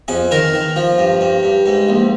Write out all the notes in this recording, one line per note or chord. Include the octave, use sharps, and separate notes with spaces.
F2 G#4
D#3 A#4
D#3
F3
G2
G2
G2
G#2
A#1